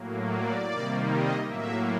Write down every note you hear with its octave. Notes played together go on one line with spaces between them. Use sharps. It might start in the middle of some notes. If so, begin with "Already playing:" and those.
Already playing: A2 F#3 A#3
D5
C3 D#3 G3 A#3
D#5
A2 F#3 A#3 E5